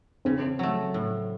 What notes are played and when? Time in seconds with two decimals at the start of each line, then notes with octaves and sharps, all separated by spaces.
0.25 C#3 C4
0.59 F#3 A3
0.94 A2